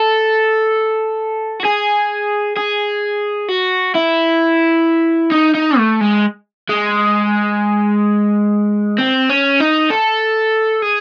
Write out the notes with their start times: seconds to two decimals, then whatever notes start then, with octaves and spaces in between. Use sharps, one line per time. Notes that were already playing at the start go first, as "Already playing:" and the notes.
Already playing: A4
1.60 F#4
1.65 G#4
2.57 G#4
3.48 F#4
3.95 E4
5.32 D#4
5.55 D#4
5.78 A3
6.01 G#3
6.69 G#3
8.98 C4
9.29 C#4
9.60 D#4
9.90 A4
10.82 G#4